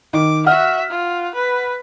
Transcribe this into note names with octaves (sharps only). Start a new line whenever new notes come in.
D#3 D6
F#4 E5 F#5 F6
F4
B4